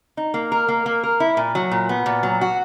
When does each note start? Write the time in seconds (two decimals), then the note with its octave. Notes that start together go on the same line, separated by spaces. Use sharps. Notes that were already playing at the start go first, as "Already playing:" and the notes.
0.17 D#4
0.34 A#3
0.52 A#4
0.68 A#3
0.86 A#3
1.04 A#4
1.20 E4
1.37 A#2
1.55 F#3
1.71 A#2
1.89 B3
2.06 A#2
2.23 F#3
2.41 F#4